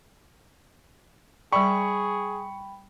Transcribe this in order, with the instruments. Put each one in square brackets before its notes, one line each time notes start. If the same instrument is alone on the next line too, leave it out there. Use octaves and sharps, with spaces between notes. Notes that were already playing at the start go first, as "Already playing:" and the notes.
[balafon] G3 D5 [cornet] G#4 [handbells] G5 B5 [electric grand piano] C#6